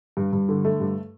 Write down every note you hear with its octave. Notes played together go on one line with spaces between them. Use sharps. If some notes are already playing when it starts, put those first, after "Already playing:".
G2
G2
D3
A3
G2